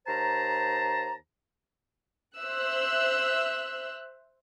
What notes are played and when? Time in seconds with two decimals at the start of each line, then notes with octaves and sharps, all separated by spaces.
0.07 D#2 C5 A5 A#5
2.37 C5 E5 E6 F#6